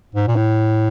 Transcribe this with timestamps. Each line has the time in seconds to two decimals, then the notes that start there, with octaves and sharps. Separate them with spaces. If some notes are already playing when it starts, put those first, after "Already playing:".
0.15 G#2
0.27 A#2
0.36 A2